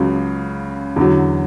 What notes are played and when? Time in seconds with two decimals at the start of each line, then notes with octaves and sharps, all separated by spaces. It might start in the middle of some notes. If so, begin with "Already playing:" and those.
Already playing: C#2 C#3 F#3
0.96 E2 D3 F#3